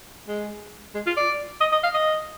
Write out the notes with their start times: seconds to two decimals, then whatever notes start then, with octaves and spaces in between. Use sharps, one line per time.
0.28 G#3
0.94 G#3
1.06 F4
1.17 D5
1.61 D#5
1.72 D#5
1.83 F5
1.94 D#5